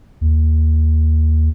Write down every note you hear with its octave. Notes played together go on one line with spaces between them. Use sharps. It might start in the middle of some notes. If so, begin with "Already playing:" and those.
D#2